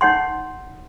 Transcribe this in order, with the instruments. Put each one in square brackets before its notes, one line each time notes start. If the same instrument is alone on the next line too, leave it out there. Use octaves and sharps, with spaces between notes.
[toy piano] D#4 C#5 F#5 C6